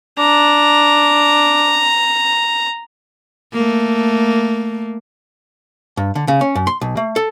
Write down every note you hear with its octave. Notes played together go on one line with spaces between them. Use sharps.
D4 A#5
A3 A#3
G2
D3
C#3
C#4
F#2
C6
B1
A3
A4